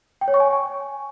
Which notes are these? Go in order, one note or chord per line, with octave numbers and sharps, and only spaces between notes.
G5
C#5
C#6
G#5